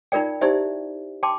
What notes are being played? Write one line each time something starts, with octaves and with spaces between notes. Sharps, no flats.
D#4 F4 A#4 D5 G5
D#4 E4 G4 C5 D5 E5
G5 A5 C6 D6